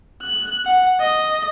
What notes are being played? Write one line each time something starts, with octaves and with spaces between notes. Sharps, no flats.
F#6
F#5
D#5